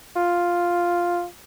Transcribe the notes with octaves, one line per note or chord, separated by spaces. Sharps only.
F4